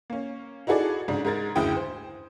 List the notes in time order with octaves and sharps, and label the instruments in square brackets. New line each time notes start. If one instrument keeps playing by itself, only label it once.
[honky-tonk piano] A#3 C#4
D#4 E4 F#4 G#4 A4 D5
G#2 C#3 G#3 D4
G#2 G#3 A#4 G#6 A6
F#1 D2 G#3 E4 G5 D#6
C5